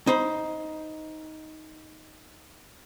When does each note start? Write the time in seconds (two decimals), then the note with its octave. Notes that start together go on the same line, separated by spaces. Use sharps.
0.07 D#4 C5 B5